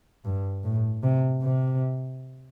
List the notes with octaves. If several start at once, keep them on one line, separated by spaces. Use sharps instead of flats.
G2
A2
C3
C3